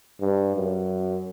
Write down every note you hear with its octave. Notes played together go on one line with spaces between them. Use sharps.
G2
F#2